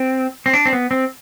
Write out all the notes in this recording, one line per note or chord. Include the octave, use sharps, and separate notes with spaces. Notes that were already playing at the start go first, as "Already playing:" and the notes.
Already playing: C4
C4
D4
C4
B3
C4